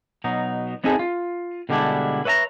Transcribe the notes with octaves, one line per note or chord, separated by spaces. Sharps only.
B2 F#3 D#4
B3 C4 D#4 E4 G#4 A4
F4
B2 D3 G3 G#3 D4 E4
B4 C#5 E5 A5 A#5